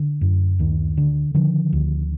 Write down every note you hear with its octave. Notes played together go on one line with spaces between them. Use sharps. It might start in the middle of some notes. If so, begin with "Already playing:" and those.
Already playing: D3
F#2
D2 D#3
D3
D3 D#3 F3
D2